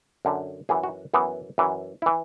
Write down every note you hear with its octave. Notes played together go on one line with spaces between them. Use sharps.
F#2 D3
F#2 E3 G#4
F#4
F#2 E3 B3
F#2 E3
E4
E3